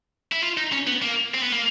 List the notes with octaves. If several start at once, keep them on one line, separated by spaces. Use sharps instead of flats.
E4
F4
D#4
C#4
B3
A#3
C4
B3
A#3